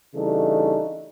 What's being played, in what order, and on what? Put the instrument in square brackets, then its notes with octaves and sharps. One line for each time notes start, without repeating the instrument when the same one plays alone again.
[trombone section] C#3 E3 G3 A3 D4 D#4